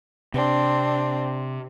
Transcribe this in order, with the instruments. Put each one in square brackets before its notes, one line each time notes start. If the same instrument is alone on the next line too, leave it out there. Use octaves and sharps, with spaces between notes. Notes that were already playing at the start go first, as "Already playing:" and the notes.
[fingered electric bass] C3 [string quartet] C4 D4